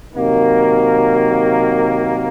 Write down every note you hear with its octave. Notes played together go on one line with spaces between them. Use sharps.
C3 D#3 F#3 A#3